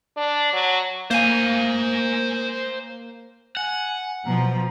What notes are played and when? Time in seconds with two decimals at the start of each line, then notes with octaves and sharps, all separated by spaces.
0.17 D4
0.53 F#3
1.11 A#3 C5 G#5
3.57 F#5 G#5
4.26 B2 F3 A#5